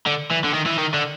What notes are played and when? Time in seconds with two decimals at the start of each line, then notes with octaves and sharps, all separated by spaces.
0.06 D3
0.31 E3
0.44 D3
0.54 D#3
0.66 E3
0.78 D#3
0.94 D3